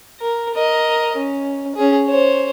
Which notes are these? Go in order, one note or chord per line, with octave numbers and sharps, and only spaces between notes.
A#4
A#4 D#5
C#4
C#4 G#4
C5 C#5